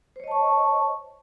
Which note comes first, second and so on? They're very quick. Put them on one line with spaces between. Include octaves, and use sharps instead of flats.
C5 C#5 D#5 A5 C#6